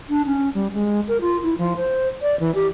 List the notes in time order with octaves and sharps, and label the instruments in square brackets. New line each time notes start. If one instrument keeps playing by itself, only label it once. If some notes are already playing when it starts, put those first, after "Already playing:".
[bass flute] D4
C#4
G3
G#3
A#4
F4
E4
F3
C5
D5
E3
G4